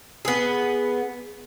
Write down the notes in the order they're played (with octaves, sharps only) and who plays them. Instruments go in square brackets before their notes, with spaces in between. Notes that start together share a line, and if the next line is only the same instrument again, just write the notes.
[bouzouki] B3 G#4